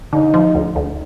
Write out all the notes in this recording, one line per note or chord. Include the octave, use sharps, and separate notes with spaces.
D3 D#4
F3
D2
D2